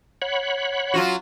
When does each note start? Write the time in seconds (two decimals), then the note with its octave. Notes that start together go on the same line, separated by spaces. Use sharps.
0.22 C#5 F#5 B5
0.94 F#3 F4 F#4